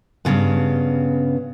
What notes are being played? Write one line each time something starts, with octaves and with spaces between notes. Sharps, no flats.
G2 A#2 C#3 B3